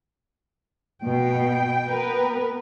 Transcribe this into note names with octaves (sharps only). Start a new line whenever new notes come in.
B2 G5
B3 A#4 B4